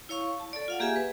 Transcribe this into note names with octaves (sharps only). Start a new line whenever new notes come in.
E4 C#5 F5 C#6
A5
A4 D5
F4 F5 F#5
A#3 G4 G#4 E5 G#5 A#5
B4